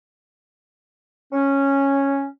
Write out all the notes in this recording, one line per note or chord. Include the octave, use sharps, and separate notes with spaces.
C#4